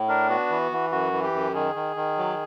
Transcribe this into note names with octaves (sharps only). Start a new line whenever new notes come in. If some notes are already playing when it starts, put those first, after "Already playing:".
Already playing: A2
D4 A#4
B3 F#4
E3
E3
F#2 F#4
E3
G4
F#2
D#3 G#4
D#3
D#3
F#3